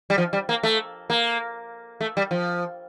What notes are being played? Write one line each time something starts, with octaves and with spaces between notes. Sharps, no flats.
G3
F3
G3
A#3
A3
A#3
A3
G3
F3